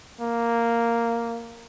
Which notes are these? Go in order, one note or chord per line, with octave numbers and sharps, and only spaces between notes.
A#3